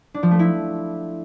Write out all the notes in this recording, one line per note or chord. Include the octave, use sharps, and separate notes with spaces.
D4
F3
A3
E4